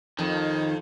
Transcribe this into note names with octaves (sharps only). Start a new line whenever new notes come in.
F2 D#3